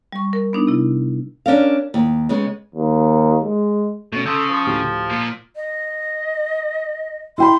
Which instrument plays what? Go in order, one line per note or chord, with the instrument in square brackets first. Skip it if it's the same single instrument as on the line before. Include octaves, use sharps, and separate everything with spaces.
[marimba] G3 C#6
A#4
B3 D4 D#4
C3 E4
[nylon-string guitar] C#4 D4 A#4 F5
D#2
C#3 G#3 B3
[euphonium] D#2
G#3
[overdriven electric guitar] B2 [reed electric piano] A3 C#4
[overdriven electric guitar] C#3 [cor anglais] A4 [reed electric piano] C6 D#6 G6
[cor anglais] F3
[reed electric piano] D2 A2 G4
[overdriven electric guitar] A#2
[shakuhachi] D#5
[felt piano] E4 G5 B5 [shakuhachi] C6